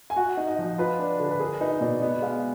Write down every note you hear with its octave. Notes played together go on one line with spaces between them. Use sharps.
G#5
F#4 F#5
D#4
D#5
F3
F4 B4
D4
D3
B4
G#4 A#4
D#4 B4
B2 D5
B3 D#5
G#3 F5